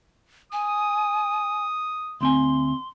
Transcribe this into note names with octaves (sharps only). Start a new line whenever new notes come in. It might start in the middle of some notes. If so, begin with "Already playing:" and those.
G#5 D#6
D2 C4 G#5 C6